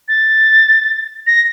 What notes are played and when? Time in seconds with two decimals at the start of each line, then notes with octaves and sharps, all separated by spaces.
0.08 A6
1.27 A#6